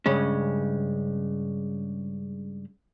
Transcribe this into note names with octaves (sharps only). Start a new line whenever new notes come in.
G2 C#3 G#3 C#4